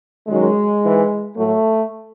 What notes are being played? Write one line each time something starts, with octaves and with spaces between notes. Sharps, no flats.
F#2 D#3 F#3 G#3
G#2 E3
A2 F#3 A3